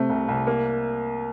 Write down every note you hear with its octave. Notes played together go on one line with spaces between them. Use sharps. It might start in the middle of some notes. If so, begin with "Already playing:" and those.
Already playing: C3 A3
C2
C2
A#3